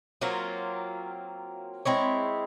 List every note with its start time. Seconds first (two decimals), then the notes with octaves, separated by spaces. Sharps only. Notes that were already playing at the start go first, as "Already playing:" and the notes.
0.21 F#3 A#3 C4 F4
1.85 G#3 C4 E4 C#5